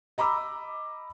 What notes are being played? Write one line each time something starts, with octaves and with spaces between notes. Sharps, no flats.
D#5 A#5 B5 D6 E6